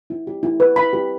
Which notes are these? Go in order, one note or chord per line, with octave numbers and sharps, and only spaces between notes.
E4
G4
E4
B4
E4 B5
G4